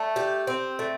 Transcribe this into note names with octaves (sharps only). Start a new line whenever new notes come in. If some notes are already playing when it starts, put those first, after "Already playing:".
Already playing: A3
G4
C4
A3